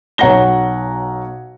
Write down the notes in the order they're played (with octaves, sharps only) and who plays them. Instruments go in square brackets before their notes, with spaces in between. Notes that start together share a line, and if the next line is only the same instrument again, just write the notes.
[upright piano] B1 C#5 F#5 A#5 A#6 G7